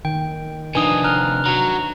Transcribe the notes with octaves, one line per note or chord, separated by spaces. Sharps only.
D#3 G5
C3 F3 D4 D#4 B4 G#5 D#6
A#5 F6 F#6
F#3 F#4 A#5